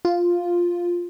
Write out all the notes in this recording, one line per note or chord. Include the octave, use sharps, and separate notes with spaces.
F4